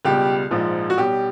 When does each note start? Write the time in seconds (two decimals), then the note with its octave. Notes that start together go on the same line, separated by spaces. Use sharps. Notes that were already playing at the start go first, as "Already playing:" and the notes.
0.05 C#2 B2 G3 G4
0.51 A#1 G#2 F3
0.90 F#4
0.97 B1 B2 G3 G4